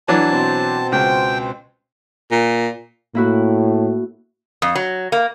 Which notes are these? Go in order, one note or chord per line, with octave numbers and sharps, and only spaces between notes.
E3 F#3 D4 A5
B2 C4 C5
C#2 G5
A#2
A2 A#3 E4 F#4
F2
F#3
A#3